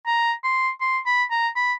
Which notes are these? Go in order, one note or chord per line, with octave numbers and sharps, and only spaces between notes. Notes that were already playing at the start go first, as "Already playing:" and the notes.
A#5
C6
C6
B5
A#5
B5